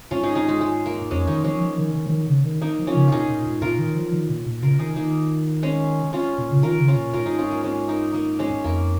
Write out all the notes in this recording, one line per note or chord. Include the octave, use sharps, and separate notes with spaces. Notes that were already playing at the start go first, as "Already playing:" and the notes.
G#2 C#4 F4
D#4 G#4
D#4 G#4
G#3
G#3
A#3
F2 G#3 C#4
D#3 A#3 D#4
F3 G#3 C#4
F3
D#3
D#3
F3
D#3
C#3
D#3
A#3 D#4
F3
C#4 F4
C#3
A#2 D#4 F4 G#4
A#2
G#2
A#2 F4 A#4
D#3
F3
D#3
A#2
A#2
C#3 F4 A#4
D#3 D#4 G#4
D#3 A#3 D#4
G#3 C#4
C#4 F4
A#2
C#3
D#3 F4 A#4
C#3
C#4 F4
A#2
G#2 F4 A#4
D#4 G#4
C#4 F4
A#3
G#3 C#4
A#3 D#4
A#3 D#4
G#3 C#4
F2 A#3